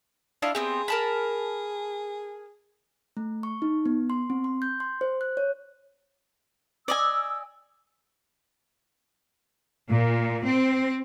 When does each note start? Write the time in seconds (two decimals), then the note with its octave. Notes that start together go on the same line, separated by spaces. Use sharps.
0.42 D4 E4 F4 D#5
0.55 B3 C4 G4 G#4
0.88 A#4 A5 B5
3.17 A3
3.43 C#6
3.62 D#4
3.86 B3
4.10 C6
4.30 C4
4.44 C6
4.62 G6
4.80 C6
5.01 C5
5.21 F#6
5.37 C#5
6.88 D5 D#5 G#5 E6
9.89 A#2
10.44 C4